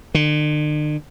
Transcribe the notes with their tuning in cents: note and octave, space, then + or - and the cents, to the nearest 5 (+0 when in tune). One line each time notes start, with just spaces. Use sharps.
D3 +45